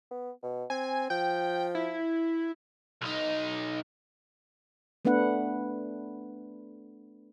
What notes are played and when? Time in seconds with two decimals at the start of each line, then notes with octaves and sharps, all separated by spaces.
0.11 B3
0.43 B2
0.70 C4 G#5
1.10 F3 G5
1.75 E4
3.01 B1 D#4
5.05 A3 B3 D4 B4 F#5